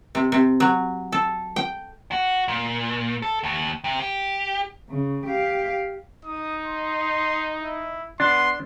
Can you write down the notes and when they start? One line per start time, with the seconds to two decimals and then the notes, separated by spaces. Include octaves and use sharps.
0.15 C3
0.32 C3
0.60 F#3
1.12 A4
1.56 G5
2.12 F#4
2.48 A#2
3.22 A4
3.43 D#2
3.84 C3
4.00 G4
4.90 C#3
5.26 G4 F5
6.25 D#4 D#6
6.65 C6
7.60 E4
8.20 B3 D4 C6